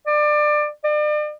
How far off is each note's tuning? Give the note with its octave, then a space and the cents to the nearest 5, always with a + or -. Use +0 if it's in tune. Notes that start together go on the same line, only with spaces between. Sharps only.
D5 +25
D5 +40